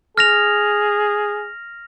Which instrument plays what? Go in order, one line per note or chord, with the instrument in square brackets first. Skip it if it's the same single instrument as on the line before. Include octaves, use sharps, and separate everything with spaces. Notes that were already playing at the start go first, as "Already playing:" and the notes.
[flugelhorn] G#4 [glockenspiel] F6 A#6 F7